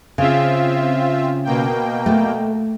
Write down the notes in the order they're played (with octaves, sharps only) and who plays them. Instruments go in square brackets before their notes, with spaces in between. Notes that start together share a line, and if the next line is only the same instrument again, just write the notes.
[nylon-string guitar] C#3 [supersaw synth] C4 F4 E5
[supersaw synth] B2 A#3 G5
[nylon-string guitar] A3